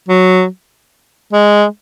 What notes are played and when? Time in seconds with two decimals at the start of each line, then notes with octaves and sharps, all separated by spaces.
0.09 F#3
1.33 G#3